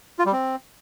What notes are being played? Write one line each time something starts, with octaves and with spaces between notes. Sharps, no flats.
F4
G3
C4